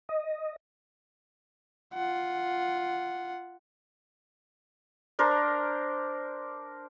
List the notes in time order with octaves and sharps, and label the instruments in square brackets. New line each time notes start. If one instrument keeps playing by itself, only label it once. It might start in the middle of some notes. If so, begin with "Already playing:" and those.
[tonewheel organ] D#5
[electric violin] F4 F#5
[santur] D4 A#4 C5